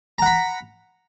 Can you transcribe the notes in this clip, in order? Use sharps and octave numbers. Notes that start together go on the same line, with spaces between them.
F#5 A#5 B5